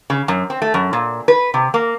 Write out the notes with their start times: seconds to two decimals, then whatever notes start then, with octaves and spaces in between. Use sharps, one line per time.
0.10 C#3
0.28 F#2
0.50 C4
0.62 A3
0.74 F#2
0.93 A#2
1.28 B4
1.54 C3
1.74 A#3